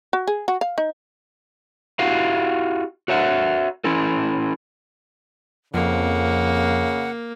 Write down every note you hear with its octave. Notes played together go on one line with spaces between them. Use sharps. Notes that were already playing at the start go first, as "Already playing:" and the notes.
F#4
G#4
F#4
F5
D#4
E4 F#4 G4 F5 F#5
F#4 C#5 E5 F#5
C#4 E4 A4
F2 C#3 A#3 F#5